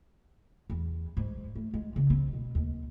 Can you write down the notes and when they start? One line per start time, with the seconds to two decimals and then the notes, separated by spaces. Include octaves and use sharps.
0.70 E2
1.17 G#2
1.56 A3
1.74 G#3
1.96 C#3
2.10 C4
2.33 B2
2.55 D#2